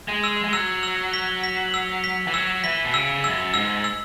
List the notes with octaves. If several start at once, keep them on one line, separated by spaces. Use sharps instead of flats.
G#3
E6
G#3
F#3 E6
E6
B6
B6
E6
B6
E3
F#3 E6
E3 B6
B2
C#3 E6
F#2 E6
G#2 E6
E6